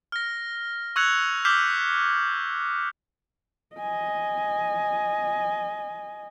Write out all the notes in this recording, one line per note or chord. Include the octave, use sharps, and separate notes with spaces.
F6 A#6
C#6 E6 F#6 G#6 C#7 F7
D6 E6 F6 G6 B6 C7
D#5 G#5